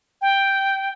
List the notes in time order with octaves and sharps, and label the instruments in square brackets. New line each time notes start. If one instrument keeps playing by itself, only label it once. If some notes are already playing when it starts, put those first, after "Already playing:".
[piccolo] G5